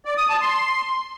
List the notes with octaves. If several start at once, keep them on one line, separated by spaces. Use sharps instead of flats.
D5
D#6
A5
C6